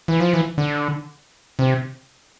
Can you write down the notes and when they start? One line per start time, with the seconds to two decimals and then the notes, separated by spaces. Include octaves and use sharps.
0.08 E3
0.20 F3
0.33 E3
0.58 D3
1.59 C3